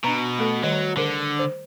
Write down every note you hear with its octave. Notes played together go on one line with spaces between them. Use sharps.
B2 D4 A#5
A3 A4
D#3 F#3 G3 D#5
D3 G#4 A#4 C5
C5